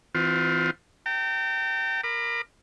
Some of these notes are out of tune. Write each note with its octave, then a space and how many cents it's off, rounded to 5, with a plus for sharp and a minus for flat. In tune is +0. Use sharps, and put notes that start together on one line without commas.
E3 +0 C4 -20 F4 +25
G5 -20 A#5 -45
A#4 +5 B5 +15 D6 +35